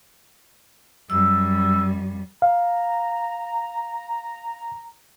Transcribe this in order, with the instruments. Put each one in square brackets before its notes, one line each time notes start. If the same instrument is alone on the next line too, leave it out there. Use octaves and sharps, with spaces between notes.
[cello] F#2 G3 [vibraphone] E6
[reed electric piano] F5 [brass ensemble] A#5